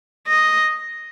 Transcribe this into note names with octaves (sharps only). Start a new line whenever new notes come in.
D#5